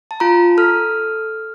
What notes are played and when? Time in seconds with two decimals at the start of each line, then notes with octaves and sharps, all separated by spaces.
0.11 A5
0.20 F4 A#5
0.58 A4 F6